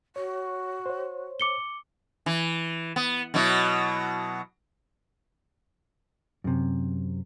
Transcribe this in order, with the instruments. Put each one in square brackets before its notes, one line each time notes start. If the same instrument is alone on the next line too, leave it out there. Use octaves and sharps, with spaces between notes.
[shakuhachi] F#4 [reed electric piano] C#5
[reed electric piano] C5 C#5
[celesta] D6 C#7 G7
[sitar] E3
B3
B2 F#3 E4
[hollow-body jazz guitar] F#2 C3